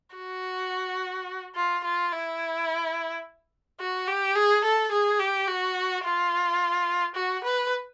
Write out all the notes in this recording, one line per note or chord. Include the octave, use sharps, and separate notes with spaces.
F#4
F4
F4
E4
F#4
G4
G#4
A4
G#4
G4
F#4
F4
F#4
B4